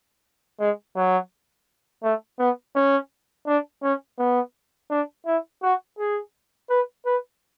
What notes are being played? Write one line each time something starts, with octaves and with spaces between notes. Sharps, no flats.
G#3
F#3
A3
B3
C#4
D4
C#4
B3
D4
E4
F#4
G#4
B4
B4